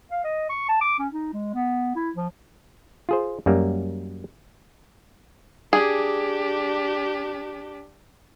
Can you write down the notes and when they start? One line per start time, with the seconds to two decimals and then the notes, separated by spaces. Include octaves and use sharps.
0.11 F5
0.24 D#5
0.49 C#6
0.68 A5
0.81 D6
0.99 C#4
1.12 D#4
1.33 G#3
1.54 B3
1.95 E4
2.16 F3
3.09 F4 G#4 C5
3.46 F#2 F#3 G3 A#3
5.73 D4 G4 G#4